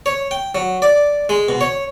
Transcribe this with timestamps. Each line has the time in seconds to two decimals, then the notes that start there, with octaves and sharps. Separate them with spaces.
0.06 C#5
0.31 G5
0.55 F#3
0.82 D5
1.29 G#3
1.49 B2
1.61 C#5